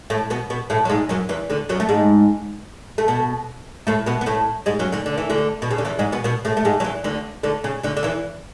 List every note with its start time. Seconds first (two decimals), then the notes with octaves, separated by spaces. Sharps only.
0.10 A2 A3
0.30 B2 B3
0.50 B2 B3
0.70 A2 A3
0.85 F#3
0.89 G#2 G#3
1.09 F#2 F#3
1.29 E2 E3
1.49 D2 D3
1.69 F#2 F#3
1.80 A3
1.89 G#2 G#3
2.98 A3
3.08 B2 B3
3.87 A2 A3
4.06 B2 B3
4.21 B3
4.26 A2 A3
4.66 G#2 G#3
4.79 F#2 F#3
4.92 D2 D3
5.06 D3
5.18 E3
5.29 D2 D3
5.62 B2
5.71 C#3
5.78 D3
5.85 E2 E3
5.99 G#2 G#3
6.12 B2 B3
6.24 B2 B3
6.45 A2 A3
6.57 A3
6.65 G#2 G#3
6.80 F#3
6.84 E2 E3
7.04 D2 D3
7.43 D2 D3
7.64 C#3
7.83 D2 D3
7.97 D3
8.03 E2 E3